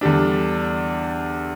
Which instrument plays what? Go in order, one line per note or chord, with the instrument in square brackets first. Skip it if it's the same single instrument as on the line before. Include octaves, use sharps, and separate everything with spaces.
[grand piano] E2 D3 G3 D4